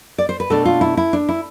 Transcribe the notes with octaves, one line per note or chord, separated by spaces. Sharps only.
D5
C5
B4
B2 A3 D4 A4
F4
E4
E4
D4
E4